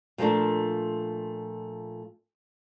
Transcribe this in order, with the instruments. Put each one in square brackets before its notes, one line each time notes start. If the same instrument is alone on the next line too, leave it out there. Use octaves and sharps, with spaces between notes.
[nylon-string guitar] A#2 F3 G3 A3 A#3 D4